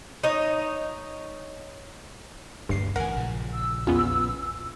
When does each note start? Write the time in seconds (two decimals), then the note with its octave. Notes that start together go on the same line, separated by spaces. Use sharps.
0.23 D#4 C#5
2.69 D#1 D2 G2 C7
2.96 A1 D2 A2 A#4 F#5 G#5
3.16 A#1 A#2 C#3
3.53 E6
3.87 E2 B3 C#4 F4